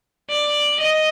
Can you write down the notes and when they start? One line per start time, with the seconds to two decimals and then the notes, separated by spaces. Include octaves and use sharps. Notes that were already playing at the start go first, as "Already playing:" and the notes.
0.30 D5
0.80 D#5